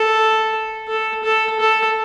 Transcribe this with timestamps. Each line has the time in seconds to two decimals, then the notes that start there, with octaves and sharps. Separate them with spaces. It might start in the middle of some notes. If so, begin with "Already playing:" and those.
Already playing: A4
0.88 A4
1.23 A4
1.60 A4